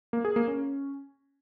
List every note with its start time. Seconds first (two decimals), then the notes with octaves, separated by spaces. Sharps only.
0.13 A#3
0.25 G#4
0.36 A#3
0.48 C#4